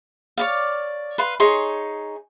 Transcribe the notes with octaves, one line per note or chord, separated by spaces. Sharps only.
C#5 D5 F5
B4 F5 C6
D#4 G#4 C#5 C6